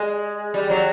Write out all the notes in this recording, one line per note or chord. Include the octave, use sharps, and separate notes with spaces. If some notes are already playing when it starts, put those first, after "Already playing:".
Already playing: G#3
G3
F#3